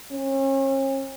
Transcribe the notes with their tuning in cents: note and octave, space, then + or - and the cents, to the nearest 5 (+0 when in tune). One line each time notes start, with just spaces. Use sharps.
C#4 -40